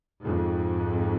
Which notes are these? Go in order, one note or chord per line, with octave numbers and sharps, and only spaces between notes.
F2 G#2